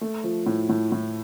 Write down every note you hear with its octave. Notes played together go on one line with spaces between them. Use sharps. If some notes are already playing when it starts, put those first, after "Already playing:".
A3
F3
A2
A2
A2